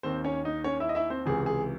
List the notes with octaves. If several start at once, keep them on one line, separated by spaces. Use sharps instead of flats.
D#2 D#3 C4 C5
C#4 C#5
D#4 D#5
C#4 C#5
E4 E5
D#5
E4 E5
C4 C5
C#2 C3 E3 G#4
G#4